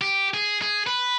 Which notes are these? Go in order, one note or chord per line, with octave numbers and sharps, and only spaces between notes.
G4
G#4
G#4
B4